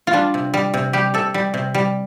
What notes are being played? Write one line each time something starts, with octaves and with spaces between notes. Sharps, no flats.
F4
G3 D4
C3
G3
C3
G3 G4
C3 A4
G3
C3
G3